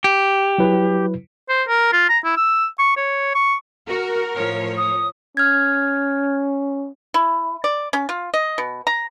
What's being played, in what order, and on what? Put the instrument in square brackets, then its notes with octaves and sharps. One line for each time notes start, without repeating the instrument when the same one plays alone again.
[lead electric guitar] G4
[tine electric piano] F#3 E4 B4
[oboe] C5
A#4
F4
A#5
E4
E6
C#6
C#5
C#6
[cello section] F#4 [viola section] A#4
[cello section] A2 F3 C#5
[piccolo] D#6
[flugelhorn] C#4 [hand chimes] F6 G#6
[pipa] E4
D5
C#4
F4
D#5
B2
A#5